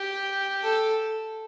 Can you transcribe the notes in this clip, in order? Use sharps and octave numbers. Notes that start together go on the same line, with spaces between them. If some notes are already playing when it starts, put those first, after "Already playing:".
Already playing: G4
A4